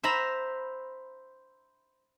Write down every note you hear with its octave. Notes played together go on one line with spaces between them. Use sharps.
C5 E5 A#5 B5